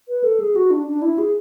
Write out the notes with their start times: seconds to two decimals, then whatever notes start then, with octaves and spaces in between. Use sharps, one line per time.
0.09 B4
0.24 A4
0.40 G#4
0.56 F#4
0.71 D4
0.87 D4
1.02 E4
1.18 G#4